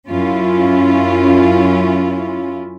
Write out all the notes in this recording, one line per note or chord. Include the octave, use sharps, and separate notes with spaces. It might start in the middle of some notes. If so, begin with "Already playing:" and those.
F#2 C#4 E4 F4